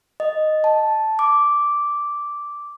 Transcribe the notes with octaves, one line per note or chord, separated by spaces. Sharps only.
D#5
A5
D6